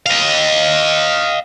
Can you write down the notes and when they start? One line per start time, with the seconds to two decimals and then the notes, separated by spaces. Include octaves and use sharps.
0.06 D#5 F5